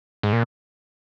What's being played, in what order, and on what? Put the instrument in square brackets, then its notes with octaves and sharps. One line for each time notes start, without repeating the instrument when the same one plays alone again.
[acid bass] G#2
A#2